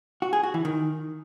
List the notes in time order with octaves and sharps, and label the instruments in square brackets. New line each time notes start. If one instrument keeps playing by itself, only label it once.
[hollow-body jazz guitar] F#4
G#4
F#4
E3
D#3